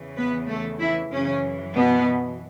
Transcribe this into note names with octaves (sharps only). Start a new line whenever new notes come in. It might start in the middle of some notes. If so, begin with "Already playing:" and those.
Already playing: E2 C#3 E3
B3 B4
A3 A4
E3 E4
F#2 C#3 E3 C#4
B2 B3